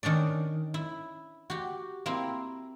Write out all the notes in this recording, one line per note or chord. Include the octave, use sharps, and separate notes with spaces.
D#3 C#4 D4 D5
E4
F#4 G4
A#3 C4 E4